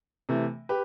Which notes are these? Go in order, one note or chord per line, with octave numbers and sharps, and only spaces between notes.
C3 E3 A3
G4 B4